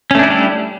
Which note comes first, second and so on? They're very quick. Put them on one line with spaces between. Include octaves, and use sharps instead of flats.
C#4 A3 D4 E4 G3